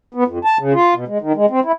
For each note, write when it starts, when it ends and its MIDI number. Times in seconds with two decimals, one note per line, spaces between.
0.14 0.24 59
0.28 0.39 41
0.45 0.58 81
0.59 0.73 49
0.74 0.94 65
0.94 1.05 47
1.08 1.18 56
1.21 1.32 51
1.36 1.46 56
1.50 1.60 60
1.65 1.72 64